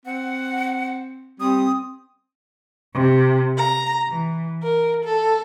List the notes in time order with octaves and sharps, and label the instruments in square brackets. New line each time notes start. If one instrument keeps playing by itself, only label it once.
[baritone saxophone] C4 [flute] F#5
[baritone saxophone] G3 [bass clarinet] C4 [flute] D#6
[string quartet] C3
A#5
E3
A#4
A4